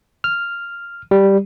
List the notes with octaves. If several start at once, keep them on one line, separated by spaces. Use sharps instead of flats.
F6
G3